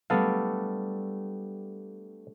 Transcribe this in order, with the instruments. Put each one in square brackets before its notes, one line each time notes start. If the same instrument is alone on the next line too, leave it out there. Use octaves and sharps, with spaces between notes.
[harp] G3 A3 D4 [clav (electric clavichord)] B3 A4 F5